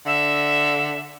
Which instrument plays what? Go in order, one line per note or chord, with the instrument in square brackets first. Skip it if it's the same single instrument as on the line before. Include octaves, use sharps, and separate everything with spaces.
[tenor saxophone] D3 [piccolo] E5